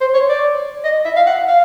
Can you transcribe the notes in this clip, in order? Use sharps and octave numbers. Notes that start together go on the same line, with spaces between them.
C5
C#5
D5
D#5
E5
F5
F#5
F5